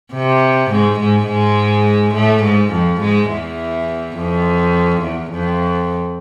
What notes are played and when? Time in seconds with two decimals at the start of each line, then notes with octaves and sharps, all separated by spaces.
0.13 C3
0.70 G#2 G#3
1.00 G#2 G#3
1.28 G#2 G#3
2.15 A2 A3
2.43 G#2 G#3
2.73 F2 F3
3.01 G#2 G#3
3.30 E2 E3
4.16 F2
5.02 E2
5.32 F2